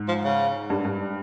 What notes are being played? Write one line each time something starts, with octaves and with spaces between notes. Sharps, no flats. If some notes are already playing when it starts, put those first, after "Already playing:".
Already playing: G#2
F3
C#3
G2
G2